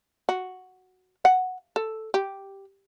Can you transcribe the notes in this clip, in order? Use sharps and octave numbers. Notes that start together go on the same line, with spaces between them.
F#4
F#5
A4
G4